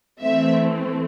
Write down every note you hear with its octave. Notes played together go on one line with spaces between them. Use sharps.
E3 A3 C4 E5